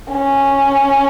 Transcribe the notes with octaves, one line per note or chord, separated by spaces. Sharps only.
C#4